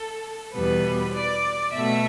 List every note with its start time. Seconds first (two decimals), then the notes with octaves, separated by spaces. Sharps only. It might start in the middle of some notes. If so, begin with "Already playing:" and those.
Already playing: A4
0.53 E2 B2 G3 B3 B4
1.13 D5
1.73 B2 A3 E5